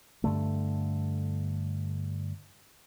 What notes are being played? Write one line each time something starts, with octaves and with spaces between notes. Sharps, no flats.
G2 D3 A3